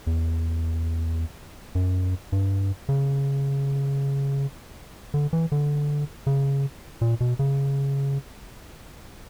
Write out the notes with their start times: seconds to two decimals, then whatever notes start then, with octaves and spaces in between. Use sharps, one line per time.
0.07 E2
1.75 F#2
2.32 G2
2.89 C#3
5.14 D3
5.33 E3
5.52 D3
6.27 C#3
7.01 A#2
7.21 B2
7.39 C#3